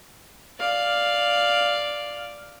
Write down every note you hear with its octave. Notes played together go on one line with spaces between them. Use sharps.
D5 F5